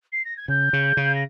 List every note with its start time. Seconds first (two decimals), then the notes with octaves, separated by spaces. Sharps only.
0.12 C7
0.24 A#6
0.37 G#6
0.48 C#3 G6
0.73 C#3
0.97 C#3
1.14 A#6